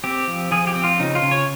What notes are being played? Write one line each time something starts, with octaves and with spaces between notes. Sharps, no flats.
C4 G4
F3
F3 G#4
G4
C4
F4
C#3 D#4
F4
C#3
C#5